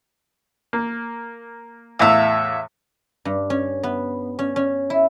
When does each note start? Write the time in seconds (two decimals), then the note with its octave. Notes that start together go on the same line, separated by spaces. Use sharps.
0.73 A#3
1.99 E2 A2 E5 F5
3.25 G2
3.50 C#4
3.83 B3
4.39 C#4
4.56 C#4
4.90 E4